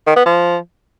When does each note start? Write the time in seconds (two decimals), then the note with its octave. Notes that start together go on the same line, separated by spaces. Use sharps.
0.07 D#3
0.16 B3
0.26 F3